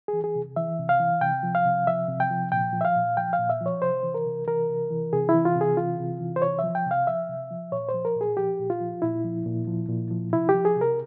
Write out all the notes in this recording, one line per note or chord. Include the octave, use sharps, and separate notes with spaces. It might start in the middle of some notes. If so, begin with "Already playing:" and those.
E3 G#4
G#4
C3
E3 E5
C3
F5
E3
C3 G5
F3
F5
C3
F3 E5
C3
G5
F3
A#2 G5
F3
E5
F5
A#2
F3 G5
F5
A#2
E5
F3 C#5
C3 C5
E3
A#4
C3
E3 A#4
C3
E3
C3 G#4
E4
E3
F4
C3
G#4
E3 F4
C3
E3
C5
C3 C#5
E5
F3
G5
C3
F5
F3 E5
C3
F3
A#2 C#5
C5
F3
A#4
A#2
G#4
F3 G4
A#2
F4
F3
A#2 E4
F3
A#2
F3
A#2
F3
C3 E4
G4
F3
G#4
C3
A#4